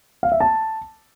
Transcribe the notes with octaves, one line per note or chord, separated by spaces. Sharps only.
F5
E5
A5